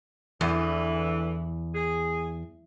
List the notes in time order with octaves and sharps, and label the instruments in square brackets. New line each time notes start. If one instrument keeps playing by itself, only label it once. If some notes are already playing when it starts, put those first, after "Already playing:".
[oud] E2 [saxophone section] D3 E3
[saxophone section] G#4